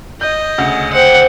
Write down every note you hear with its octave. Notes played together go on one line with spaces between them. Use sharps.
D#5 G6
D2 C#3
C5 F#5 G5